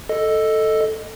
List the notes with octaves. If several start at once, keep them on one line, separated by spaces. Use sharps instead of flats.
A4 D#5